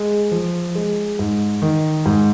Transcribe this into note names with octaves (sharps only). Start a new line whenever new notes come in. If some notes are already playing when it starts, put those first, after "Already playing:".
Already playing: G#3
F3
G#3
G#2
D#3
G#2